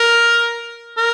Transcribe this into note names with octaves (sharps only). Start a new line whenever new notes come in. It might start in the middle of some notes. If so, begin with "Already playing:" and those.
Already playing: A#4
A#4